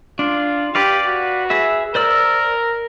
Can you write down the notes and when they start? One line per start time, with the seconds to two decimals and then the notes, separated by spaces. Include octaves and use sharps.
0.19 D4 F4
0.75 G4 B4 D5 F5
1.06 F#4
1.50 G#4 B4 E5
1.95 A#4 C5 D5 E6